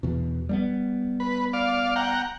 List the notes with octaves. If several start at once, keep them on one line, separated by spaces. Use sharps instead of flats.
E2 B2
G3 A3 B3
B4
D5 F5
F#5 G5 A#5